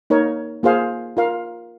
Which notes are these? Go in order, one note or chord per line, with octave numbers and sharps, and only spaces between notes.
A#3 D#4 A#4 C#5
A#3 F4 G#4 C5 F5
F4 A#4 F5